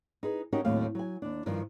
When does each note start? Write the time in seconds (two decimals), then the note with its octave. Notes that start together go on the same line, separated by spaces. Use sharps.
0.23 D#4 G#4 B4
0.52 C#4 D#4 F#4 G4 A#4
0.65 D#2 A2 F#3 C4 F5
0.95 F#3 G#5
1.22 D#2 D4
1.46 G2 D#3 F3